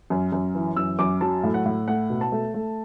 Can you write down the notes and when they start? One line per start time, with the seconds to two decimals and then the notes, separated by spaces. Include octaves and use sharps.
0.10 F#2
0.32 F#2
0.55 E3
0.77 F#2 E6
0.99 F#2 D6
1.21 F#3 A5
1.44 A2
1.54 F#5
1.65 A2
1.88 A3 F#5
2.10 B2
2.21 A5
2.32 A3
2.54 A3